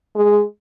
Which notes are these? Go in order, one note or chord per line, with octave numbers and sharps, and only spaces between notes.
G#3